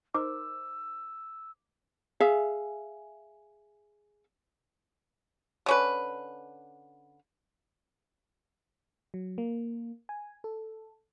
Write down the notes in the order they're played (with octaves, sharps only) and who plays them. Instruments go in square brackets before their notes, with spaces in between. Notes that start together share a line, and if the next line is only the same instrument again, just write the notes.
[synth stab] D#4 A#4 C5 [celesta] D6 [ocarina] E6
[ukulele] G#4 E5 F5
[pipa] D3 C#4 B4
[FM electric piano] F#3
A#3
G#5
A4